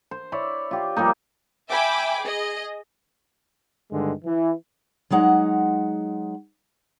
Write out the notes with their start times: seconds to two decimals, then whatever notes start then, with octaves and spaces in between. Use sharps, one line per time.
0.11 C5
0.32 E4 C#5 D5
0.71 F4 G4
0.96 F3 G3 A#3 D#4
1.70 E5 G5 G#5 B5 D6
2.20 G#4 D#5
3.92 G2 D3 D#3 G#3
4.24 E3
5.10 F#3 G#3 D#4 F#5